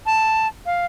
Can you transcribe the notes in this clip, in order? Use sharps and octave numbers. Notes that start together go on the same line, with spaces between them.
A5
F5